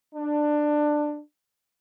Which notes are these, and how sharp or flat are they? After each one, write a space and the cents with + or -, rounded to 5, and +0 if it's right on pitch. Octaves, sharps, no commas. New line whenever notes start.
D4 +15